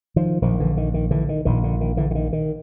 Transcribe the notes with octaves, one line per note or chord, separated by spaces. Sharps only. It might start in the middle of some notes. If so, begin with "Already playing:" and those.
D#3 F3
A#1 A#2 D#3 F3
D3 E3
D#3
D#3
D3 E3
D#3
A#1 A#2 D#3
D3
D#3
D3 E3
D3
D#3
D#3